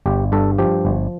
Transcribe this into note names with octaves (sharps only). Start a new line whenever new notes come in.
G1 G4
G2 A4
F3 G4
G1